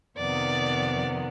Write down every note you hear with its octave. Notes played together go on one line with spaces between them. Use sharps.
F2 C3 D#3 B3 D5